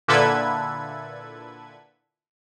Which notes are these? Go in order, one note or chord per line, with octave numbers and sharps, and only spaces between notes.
A#2 D3 E4 A4 B4 G#6